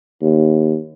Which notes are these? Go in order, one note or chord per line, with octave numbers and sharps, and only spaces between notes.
D#2